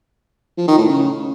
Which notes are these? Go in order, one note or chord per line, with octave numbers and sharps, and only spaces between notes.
F3
D#3
A2
C#3